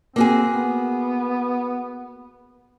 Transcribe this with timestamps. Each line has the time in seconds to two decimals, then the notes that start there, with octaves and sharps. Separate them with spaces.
0.16 A#3 C4 F#4 G#4
0.53 B3